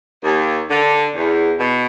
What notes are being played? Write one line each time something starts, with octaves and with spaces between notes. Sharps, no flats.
D#2
D3
E2
B2